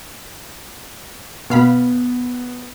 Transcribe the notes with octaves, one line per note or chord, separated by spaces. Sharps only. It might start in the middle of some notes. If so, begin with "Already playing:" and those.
B2 B3 F5 B5